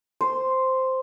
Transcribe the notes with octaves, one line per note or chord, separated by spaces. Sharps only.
C5